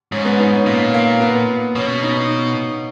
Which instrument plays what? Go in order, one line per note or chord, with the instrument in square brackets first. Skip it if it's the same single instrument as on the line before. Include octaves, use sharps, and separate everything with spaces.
[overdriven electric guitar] G#2 [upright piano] C#4
[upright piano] B3
D#4
C#4
[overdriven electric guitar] A#2 [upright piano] A#3
[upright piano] A#3
B3
[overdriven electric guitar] B2 [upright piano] C#4
[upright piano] D#4